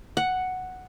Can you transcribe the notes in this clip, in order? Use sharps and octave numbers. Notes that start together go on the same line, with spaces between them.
F#5